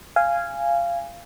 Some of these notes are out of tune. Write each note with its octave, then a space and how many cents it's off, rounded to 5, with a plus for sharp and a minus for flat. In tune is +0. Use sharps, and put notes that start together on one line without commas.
F5 -15 G#5 -10